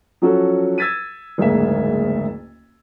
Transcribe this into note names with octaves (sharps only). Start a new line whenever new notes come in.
F3 F#3 C#4 F#4 A4
E6 G#6 A6 B6 D#7
F#1 D2 G#2 A#3 E5